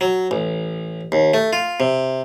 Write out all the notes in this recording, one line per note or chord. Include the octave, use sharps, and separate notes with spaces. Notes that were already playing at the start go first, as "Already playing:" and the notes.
F#3
A1
D#2
A3
F4
C3